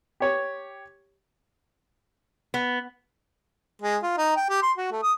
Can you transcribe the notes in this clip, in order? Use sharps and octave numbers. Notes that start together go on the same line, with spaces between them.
G4 C#5
B3
G#3
F4
D#4
G5
G4
C6
F#4
A3
D#6